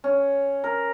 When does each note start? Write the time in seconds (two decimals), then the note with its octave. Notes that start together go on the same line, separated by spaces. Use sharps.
0.04 C#4
0.64 A#4